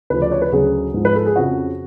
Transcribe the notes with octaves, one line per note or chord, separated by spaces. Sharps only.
D2 C#3 F3 B4
D5
C#5
B4
D2 C#3 F#3 G#4
G#2 F3
B4
A4
G#4
F2 C#3 F3 F#4